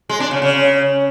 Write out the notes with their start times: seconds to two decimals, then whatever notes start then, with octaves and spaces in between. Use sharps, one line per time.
0.09 G#3
0.20 D4
0.31 C#3
0.42 C#3